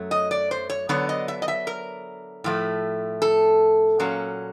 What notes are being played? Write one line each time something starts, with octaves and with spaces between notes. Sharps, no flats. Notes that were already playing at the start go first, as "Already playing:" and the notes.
Already playing: F#2 F#3 A3
D#5
D5
C5
C#5
D3 F#3 B3 D4 C#5
D#5
E5
D#5
E5
A#4
A2 F3 A3
A4
A#2 F#3 A#3 C#4